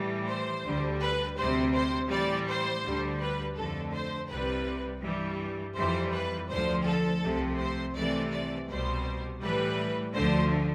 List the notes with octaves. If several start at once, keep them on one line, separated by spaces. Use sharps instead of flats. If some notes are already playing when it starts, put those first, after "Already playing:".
Already playing: A2 E3 G3
C5
D2 D3 G3
B4
D2 C3 G3 C5
C5
A2 E3 G3 D5
C5
D2 D3 G3
B4
F2 D3 A3 A4
C5
C2 C3 G3 B4
G2 E3 G3
F2 E3 G3 C5
B4
D2 D3 F3 C5
A4
C2 C3 F3 A3
C5
C2 C3 E3 A3 D5
D5
C2 B2 G3 C5
A2 E3 G3 B4
D2 D3 F3 A3 C5